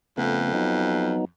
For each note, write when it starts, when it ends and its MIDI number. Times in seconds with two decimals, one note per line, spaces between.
0.18 1.28 41
0.18 0.53 49
0.18 0.53 57
0.18 0.53 59
0.54 1.25 54
0.54 1.25 59
0.54 1.25 63